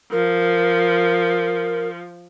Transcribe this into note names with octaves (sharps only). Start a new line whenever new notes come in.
F3 A#4